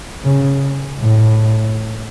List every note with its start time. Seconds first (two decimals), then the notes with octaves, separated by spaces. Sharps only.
0.24 C#3
1.00 A2